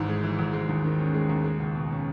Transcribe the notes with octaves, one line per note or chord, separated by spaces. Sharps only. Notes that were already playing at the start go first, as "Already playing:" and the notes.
Already playing: G#1 G#2 E3
G#3
E3
G#1
G#3
D#2
D#3
C#4
G#3
D#2
G#3
C#2
B2
C#4